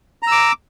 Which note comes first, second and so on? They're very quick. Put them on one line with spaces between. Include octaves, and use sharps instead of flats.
A#5 E6 D6